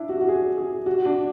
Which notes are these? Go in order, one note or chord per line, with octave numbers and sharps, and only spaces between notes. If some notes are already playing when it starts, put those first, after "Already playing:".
Already playing: D4 E4
F#4
F#4
G#4
G#4
F#4
D4